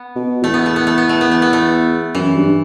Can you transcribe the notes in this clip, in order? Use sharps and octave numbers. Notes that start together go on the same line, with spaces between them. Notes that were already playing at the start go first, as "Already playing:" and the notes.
Already playing: B3
B2
E2 A3
B3
A3
B3
A3
B3
A3
B3
A3
B3
A3
F#2 E3
G2